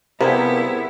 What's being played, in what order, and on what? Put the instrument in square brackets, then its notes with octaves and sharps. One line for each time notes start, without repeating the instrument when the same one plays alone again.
[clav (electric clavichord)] C3 [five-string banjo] F3 G3 G#4 [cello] B3 E4 [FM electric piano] A#4 B5